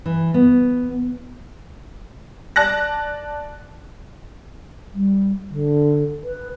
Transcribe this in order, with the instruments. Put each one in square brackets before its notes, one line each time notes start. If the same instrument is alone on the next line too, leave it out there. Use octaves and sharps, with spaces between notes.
[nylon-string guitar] E3
B3
[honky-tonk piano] D5 A5 F#6 A#6
[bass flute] G3
D3
B4